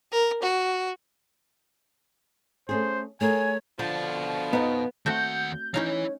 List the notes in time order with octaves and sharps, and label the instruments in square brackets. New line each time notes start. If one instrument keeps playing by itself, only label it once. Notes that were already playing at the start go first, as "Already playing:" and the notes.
[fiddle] A#4
F#4
[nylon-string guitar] A3 C#4 G#4 [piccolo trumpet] C5
[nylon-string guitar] A3 G#4 A#4 [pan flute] C#5 [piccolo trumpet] G#5
[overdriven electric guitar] B2 A5 [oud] D3 C5 [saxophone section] F3
[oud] F2 D#4 [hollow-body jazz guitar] B3
[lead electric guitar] D#2 F#5 [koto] A3 C4 F#4 [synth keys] G6
[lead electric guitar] E3 E4 [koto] C#4 D#4 F5 [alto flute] C#5